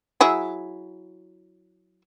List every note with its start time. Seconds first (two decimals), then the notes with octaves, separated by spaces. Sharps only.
0.21 F#3 E4 G#4